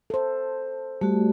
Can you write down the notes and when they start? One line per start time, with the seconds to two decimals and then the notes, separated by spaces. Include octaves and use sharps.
0.10 A4 C5
1.01 G3 A3 F#4